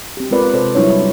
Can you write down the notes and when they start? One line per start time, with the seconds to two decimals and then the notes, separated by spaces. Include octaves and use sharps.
0.17 C4 G4
0.31 G#3 C4 F4 A#4 B4 D5
0.53 C3 A4 C5 D5
0.75 F#3 G3 D4 E4 C#5